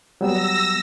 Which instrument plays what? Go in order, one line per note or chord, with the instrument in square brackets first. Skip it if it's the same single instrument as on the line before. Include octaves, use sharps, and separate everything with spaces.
[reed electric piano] F#3 G3 B3 [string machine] E6 A#6